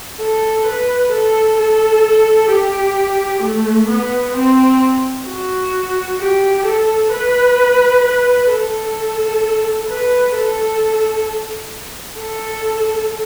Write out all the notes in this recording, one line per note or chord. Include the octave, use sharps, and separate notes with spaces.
A4
B4
A4
A4
G4
A3
B3
C4
F#4
G4
A4
B4
B4
A4
B4
A4
A4